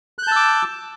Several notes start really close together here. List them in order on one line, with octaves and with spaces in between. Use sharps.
F#6 G6 A5 E6 D6